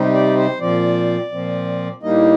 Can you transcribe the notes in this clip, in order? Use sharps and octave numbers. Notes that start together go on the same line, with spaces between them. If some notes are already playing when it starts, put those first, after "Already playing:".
Already playing: C3 G3 C4 D#4
D5
C5
A#2 F3 C4 D5
A#2 F3 C4
A2 G3 A#3 D#4 D#5